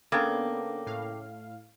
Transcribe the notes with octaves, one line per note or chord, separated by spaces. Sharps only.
C#3 A#3 B3 D4 A4 G5 D6
A2 F5